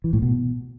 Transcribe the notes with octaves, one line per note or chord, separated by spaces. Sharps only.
E3
A2
B2